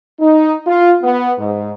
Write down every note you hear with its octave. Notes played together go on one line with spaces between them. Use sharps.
D#4
F4
B3
G#2